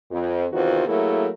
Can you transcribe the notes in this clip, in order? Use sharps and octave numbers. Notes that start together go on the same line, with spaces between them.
F2
E2 C3 D#3 F4 F#4 C5
F#3 A3 A#3 E4 G#4 A#4